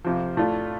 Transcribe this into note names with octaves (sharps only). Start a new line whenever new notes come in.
F2 C3 F3
A2 A3 D4 F4